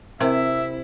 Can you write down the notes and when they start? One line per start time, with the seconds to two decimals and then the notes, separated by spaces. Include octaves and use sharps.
0.21 C3 C4 E4 A#4 E5